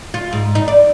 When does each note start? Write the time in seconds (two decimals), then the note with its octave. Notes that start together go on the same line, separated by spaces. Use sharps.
0.14 F4
0.33 G#2
0.55 D#4
0.68 D5